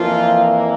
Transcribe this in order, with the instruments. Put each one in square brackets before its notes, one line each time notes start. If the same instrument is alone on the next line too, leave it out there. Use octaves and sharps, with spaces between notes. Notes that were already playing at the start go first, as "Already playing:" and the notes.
Already playing: [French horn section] F2 E3 F3 A#3 F4